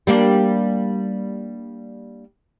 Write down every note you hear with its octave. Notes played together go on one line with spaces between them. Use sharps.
G3 A#3 D4